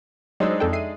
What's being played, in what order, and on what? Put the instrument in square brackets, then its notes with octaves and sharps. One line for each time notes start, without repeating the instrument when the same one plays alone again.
[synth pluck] F#3 C5 E6 [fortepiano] G#3 D4 D#4
[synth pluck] F2 A4 G5
E5 C7 D#7